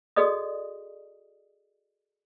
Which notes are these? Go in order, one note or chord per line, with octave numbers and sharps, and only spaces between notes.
F#4 G#4 A4 D5 D#5 D#6